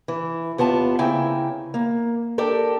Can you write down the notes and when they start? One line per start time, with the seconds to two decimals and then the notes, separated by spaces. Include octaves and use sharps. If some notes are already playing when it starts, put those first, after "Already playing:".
0.08 E3
0.58 D#2 B3 F4 A5
0.99 C#3 A#3 C4 E4 G5 G#5
1.74 A#3
2.38 D4 G4 A4 A#4